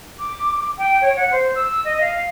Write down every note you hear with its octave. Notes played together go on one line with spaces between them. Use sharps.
D6
G5
C#5
F#5
C5
E6
D#5
F5